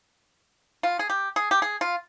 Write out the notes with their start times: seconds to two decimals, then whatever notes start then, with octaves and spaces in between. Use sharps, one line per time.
0.83 F4
0.99 G#4
1.10 G4
1.36 G#4
1.51 G4
1.62 G#4
1.81 F4